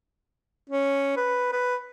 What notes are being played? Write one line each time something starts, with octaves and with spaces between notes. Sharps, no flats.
C#4
B4
B4